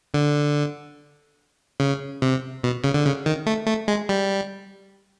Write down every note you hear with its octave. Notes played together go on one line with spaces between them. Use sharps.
D3
C#3
C3
B2
C#3
D3
C#3
D#3
A3
A3
G#3
G3